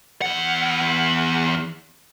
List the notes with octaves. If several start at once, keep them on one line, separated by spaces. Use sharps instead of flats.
E2 F#5